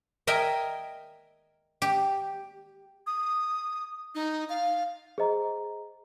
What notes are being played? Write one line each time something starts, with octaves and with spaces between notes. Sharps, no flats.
A#4 D#5 E5 G5 G#5
G4
D#6
D#4
F5
G#4 C5 D#5 A#5